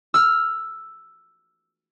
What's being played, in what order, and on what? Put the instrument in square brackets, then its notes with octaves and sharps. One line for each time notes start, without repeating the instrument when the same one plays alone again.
[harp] E6 F6